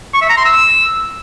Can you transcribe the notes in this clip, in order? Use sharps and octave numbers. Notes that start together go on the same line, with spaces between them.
C#6
E5
A#5
C6
E6